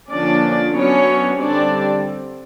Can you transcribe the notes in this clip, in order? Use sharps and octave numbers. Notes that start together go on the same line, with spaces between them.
D3 F3 A#3 C#4 D4 D5
F#3 B3 C#4 D4 C#5
D3 G3 C4 D4 D5